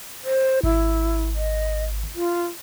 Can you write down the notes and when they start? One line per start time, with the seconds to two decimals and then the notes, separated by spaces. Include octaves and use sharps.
0.24 C5
0.64 G#1 E4
1.35 D#5
2.15 F4